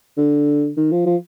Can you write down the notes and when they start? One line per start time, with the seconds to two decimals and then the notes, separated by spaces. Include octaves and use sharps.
0.17 D3
0.77 D#3
0.92 F3
1.06 F3